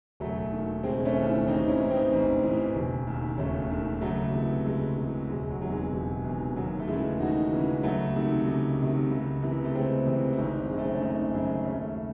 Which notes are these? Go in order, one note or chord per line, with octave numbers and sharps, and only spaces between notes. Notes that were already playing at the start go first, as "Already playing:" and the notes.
E1 F#3 A3
D#2 D#3
E1 G#3 C4
A3 C#4
D#2 D#3
C#4 E4
A1 C4 D#4
C#4 E4
G#2 E3
C4 D#4
A1
G#2 E3
E1
D#2 D#3
E1 A3 C#4
D#2 D#3
C#2 F#3 A3
C3 E3
C#2 G#3
C3 E3
E1 G#3
F#3
E2 C3 D#3 F#3
G#3
E1
E2 C3 D#3
D#2 F#3
A3
C#3 E3 G#3
D#2 D#4 F#4
C#3 E3
C#2 F#3 A3
C3 D#3
C#2
C3 D#3
C#2
C3 E3
A3
C#2 G#3 C4
C3 E3
E4
G#1 C4 D#4
F#2 C#3 G#3
A3
C4
C#4
G#1 C4 D#4
F#2 C#3
D#2 A3 C#4
C#3